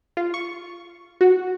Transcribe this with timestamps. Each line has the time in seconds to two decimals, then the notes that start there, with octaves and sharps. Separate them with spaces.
0.17 F4
0.34 C#6
1.21 F#4